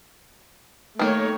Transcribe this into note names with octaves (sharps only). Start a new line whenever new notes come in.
D#3 A3 A#3 C#5